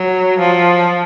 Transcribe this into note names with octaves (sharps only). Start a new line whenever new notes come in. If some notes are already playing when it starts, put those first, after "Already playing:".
Already playing: F#3
F3